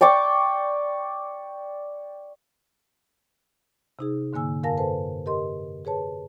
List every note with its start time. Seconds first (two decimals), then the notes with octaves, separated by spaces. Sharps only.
0.01 D5 G5 C#6 D6
3.99 C3 D#4 G#4
4.33 G#2 D3 A#3 G#5 E6
4.63 F#2 A#4 F5 G#5 A5 A#6
4.77 A4 B4 C5 A5
5.26 G4 A#4 D#5 C6
5.85 G#4 B4 C#5 A5